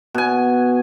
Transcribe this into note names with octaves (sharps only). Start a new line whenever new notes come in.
B2 G#5